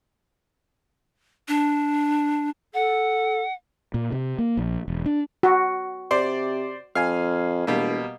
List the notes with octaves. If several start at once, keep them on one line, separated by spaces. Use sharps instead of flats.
D4
A4 F#5
A#2
C3
A#3
A#1
E1
D4
F#4
C3 C5 D5
F2 F5 G#5
E1 B2 G3 A#3